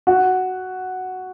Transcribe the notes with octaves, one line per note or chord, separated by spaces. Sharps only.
F#4